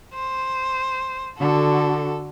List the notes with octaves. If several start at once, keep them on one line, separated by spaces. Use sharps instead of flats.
C5
D3 F#4 A4